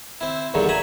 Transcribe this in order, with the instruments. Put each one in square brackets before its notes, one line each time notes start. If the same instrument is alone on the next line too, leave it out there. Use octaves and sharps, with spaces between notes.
[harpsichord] C4 E4
E2 G2 D3 D#3 F#3
E5 G#5 A#5 B5